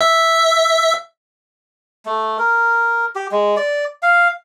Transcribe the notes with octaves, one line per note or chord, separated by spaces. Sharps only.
E5
A3
A#4
G4
G#3
D5
F5